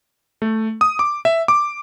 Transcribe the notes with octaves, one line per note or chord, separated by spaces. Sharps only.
A3
D#6
D6
E5
D6